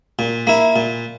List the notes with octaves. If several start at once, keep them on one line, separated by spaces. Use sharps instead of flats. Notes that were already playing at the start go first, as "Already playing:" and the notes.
A#2
A#3 E4
A#2